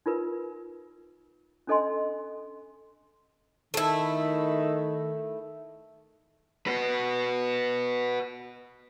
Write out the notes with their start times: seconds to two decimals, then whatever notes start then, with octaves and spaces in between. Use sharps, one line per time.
0.06 D#4 F4 A#4 B4
1.67 C#4 D4 A4 D#5 G#5 C6
3.74 D#3 A3 E4
6.67 F#4 B4